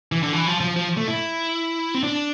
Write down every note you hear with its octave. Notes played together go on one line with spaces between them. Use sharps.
E3
D3
E3
F3
F3
F3
A3
E4
C4
D4